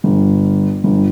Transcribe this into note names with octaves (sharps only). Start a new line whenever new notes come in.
G1
G1